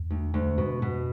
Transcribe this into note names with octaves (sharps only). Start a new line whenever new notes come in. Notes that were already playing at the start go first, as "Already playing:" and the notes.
Already playing: E2
D2
D2
F2 B2
B2